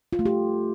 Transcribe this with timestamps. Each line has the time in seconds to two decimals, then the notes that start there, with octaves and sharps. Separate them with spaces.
0.13 F4
0.19 A3
0.26 G4